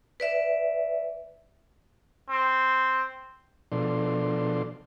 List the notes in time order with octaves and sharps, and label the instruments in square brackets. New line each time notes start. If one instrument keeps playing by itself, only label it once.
[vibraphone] B4 D5 E5
[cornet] C4
[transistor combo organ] B2 F3 D4 A4 D5 C6